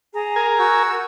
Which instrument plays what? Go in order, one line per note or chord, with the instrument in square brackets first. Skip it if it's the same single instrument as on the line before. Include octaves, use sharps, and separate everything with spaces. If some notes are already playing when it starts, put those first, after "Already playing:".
[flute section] G#4 A#5
[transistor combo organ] A#4 G#5
[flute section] F#4 E6 G6